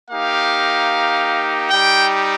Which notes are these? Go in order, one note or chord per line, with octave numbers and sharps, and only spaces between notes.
A#3 D#4 G4 F5
G3 D#4 G4 G5